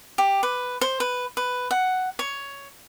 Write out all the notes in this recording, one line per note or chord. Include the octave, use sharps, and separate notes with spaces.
G4
B4
C5
B4
B4
F#5
C#5